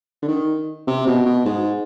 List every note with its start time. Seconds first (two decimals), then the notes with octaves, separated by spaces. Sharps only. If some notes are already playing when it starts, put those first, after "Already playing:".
0.22 D3
0.28 D#3
0.87 C3
1.07 B2
1.26 B2
1.45 G#2